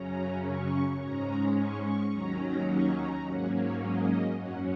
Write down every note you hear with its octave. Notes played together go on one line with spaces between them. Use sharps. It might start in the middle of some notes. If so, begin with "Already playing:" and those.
Already playing: F#2 C#3 F#3 C#4 A#5
C#6
G#2 G#3 C#4 A#5
C#6
C#6
D#2 D#3 F#3 C#4 A#5
A#5
C#6
A#5
G#2 F#3 A#3 C#4 F#5
C#5
D#5
F#2 F#3 C#4 F#5